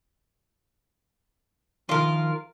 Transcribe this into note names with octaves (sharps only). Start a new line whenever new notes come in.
D#3 F3 F4 A#4